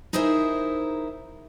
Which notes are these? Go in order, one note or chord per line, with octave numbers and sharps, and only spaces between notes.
D#4 E4 G#4 A#4 C5 E5